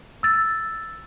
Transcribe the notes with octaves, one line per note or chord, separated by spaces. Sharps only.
E6 A6